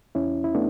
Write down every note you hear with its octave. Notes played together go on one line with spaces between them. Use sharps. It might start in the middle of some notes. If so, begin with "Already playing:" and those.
E2 C#4 E4
E4
A3 B3 D4